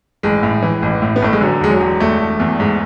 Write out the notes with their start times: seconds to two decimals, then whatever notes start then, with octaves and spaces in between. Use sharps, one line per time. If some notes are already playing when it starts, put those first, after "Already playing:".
0.23 A1 G#3
0.43 A2
0.62 E3
0.82 A1
1.02 A2
1.16 B3
1.22 A1 A3
1.33 G#3
1.41 D3 F#3
1.61 E1 G#3
1.70 F#3
1.80 E1
2.00 E1 A3
2.20 E1
2.40 E2
2.60 G#2